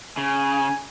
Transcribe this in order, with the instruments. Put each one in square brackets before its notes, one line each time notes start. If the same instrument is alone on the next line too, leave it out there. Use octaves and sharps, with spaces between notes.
[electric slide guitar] C#3 [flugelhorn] G#5